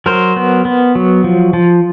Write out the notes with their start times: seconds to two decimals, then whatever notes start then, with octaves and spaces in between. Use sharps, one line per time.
0.06 F#3 A#4 C5
0.36 B3
0.65 B3
0.95 F#3
1.24 F3
1.53 F3